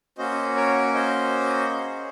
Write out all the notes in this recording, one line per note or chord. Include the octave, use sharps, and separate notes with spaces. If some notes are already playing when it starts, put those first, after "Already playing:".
A#3 C#4 F#4 C5 D#5
A#4 C#5
C5 D#5
C#4 G#4